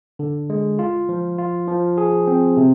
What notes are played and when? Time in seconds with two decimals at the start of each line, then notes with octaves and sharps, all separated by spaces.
0.19 D3
0.50 G#3
0.79 F4
1.09 F3
1.38 F4
1.68 F3
1.98 G#4
2.27 C4
2.57 C3